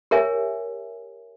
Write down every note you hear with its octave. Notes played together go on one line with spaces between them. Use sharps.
G4 A#4 C#5 E5 G#5